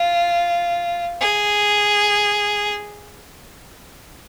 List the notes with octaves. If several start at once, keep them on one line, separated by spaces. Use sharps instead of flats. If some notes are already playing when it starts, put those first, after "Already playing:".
Already playing: F4
G#4